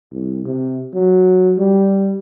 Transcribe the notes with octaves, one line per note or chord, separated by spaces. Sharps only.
C2
C3
F#3
G3